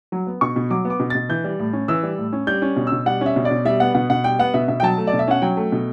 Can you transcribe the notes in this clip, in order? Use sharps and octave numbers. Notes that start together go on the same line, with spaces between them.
F#3
B3
B2 C#6
B2
F#3 D6
B3
D6
B2
B2 A6
E3 G6
G3
A2
C#4
E3 E6
G3
A2
C#4
G3 G6
C#4
B2
E6
B2
G3 F#5
C#4 E5
B2
D5
B2
G3 E5
B3 F#5
B2 F#5
B2 F#5
G3 G5
B3 F#5
B2 E5
B2 E5
G5
F#3 A5
A3
D5
B2
E5
C#4 F#5
F#3 G5
A3
B2